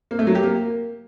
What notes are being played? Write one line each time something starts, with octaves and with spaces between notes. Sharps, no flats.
A#3
A3
F#3
G4
A#3